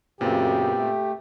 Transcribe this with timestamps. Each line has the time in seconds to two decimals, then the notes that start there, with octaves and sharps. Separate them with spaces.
0.21 F#2 A#2 C#3 B3 C4 G4
0.77 A3